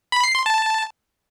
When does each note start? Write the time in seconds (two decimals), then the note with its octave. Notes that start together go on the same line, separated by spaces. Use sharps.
0.12 B5
0.24 C7
0.35 C6
0.46 A5